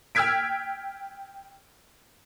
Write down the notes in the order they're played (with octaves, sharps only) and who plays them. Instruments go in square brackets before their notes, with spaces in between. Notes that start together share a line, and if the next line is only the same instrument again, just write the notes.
[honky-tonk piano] G5 E6 F6 G#6 B6 D7